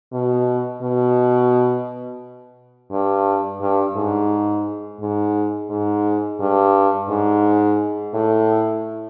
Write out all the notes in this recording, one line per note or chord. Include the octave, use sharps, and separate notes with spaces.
B2
B2
G2
G2
G#2
G#2
G#2
G2
G#2
A2